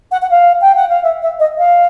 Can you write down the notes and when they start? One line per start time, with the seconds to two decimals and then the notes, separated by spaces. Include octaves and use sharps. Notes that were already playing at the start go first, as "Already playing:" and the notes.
0.11 F#5
0.22 F#5
0.30 F5
0.61 G5
0.75 F#5
0.89 F5
1.03 E5
1.22 E5
1.39 D#5
1.58 F5